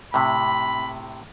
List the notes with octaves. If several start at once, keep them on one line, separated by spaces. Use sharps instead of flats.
A2 C3 B5